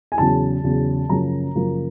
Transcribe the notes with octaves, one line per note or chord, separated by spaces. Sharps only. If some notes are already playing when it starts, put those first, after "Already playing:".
G#5
E2 C#3 F#3 A5
E2 C#3 F#3
F#2 C#3 F3 A#3 A#5
F#2 C#3 F3 A#3